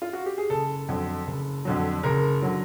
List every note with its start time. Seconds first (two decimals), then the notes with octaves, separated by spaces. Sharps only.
0.02 F4
0.13 F#4
0.26 G4
0.38 G#4
0.50 F#1 A4
0.88 F2 D3 F#3
1.27 F#1
1.65 F2 D3 F#3
2.03 F#1 A#4
2.42 D3 F#3